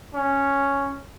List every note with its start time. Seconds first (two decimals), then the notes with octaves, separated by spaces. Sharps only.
0.15 C#4